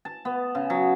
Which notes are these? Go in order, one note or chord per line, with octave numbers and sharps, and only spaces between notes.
A5
B3
C#3
F#3